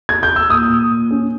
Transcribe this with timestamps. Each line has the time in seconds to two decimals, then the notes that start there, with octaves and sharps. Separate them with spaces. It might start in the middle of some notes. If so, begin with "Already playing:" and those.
0.09 G#6
0.23 G6
0.36 E6
0.49 A#2 D#6
0.69 A#2
0.91 A#2
1.11 C#4